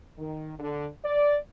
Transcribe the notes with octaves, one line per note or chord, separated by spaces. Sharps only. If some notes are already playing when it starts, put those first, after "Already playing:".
D#3
D3
D5